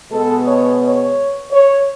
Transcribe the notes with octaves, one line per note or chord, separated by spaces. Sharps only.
B2 G#3 B3 A4
C#5
C#5
C#5